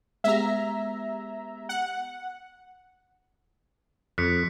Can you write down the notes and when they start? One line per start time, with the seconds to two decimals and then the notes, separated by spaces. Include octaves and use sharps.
0.24 G#3 B3 G4 E5 A#5
1.69 F#5
4.18 F2 F#6 B6 C#7